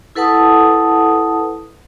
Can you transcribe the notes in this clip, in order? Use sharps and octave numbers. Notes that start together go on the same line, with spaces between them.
E4 A4 B4 F#5 A5 D#6